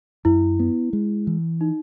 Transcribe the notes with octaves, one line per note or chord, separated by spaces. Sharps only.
F#2 E4
B3
G#3
E3
D#4